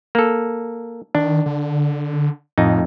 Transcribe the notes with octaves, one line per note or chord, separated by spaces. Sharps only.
A#3 A4
D#3 D4
D3
F2 A2 D#4